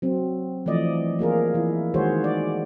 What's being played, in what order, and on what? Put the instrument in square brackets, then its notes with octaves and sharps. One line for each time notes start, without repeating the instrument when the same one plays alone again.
[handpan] F#3 C4
E3 F3 A3 D5 D#5
A#3 F4 G#4 A#4
E3 E4
D#3 G#3 F#4 G#4 C5 C#5
D5